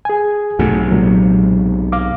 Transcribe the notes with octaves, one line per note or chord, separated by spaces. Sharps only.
G#4 G#5
B1 G#2 C3 A3 F#4
A#2 F#3 G#3
F5 D6